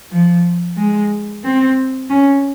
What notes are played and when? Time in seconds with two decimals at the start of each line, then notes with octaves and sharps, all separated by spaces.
0.11 F3
0.77 G#3
1.44 C4
2.10 C#4